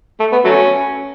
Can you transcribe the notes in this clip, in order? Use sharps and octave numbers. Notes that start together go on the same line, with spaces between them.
A3
B3
F#3 A3 C#4